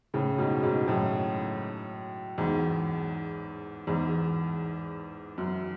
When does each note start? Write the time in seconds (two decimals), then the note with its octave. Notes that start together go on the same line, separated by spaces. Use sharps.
0.14 A2 C#3
0.38 G#2 B2
0.63 G#2 B2
0.88 F#2 A2
2.38 E2 G#2
3.87 E2 G#2
5.38 F#2